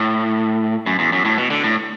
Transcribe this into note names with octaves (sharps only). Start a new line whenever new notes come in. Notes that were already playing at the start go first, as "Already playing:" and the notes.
Already playing: A2
F#2
E2
F#2
A2
B2
D3
A2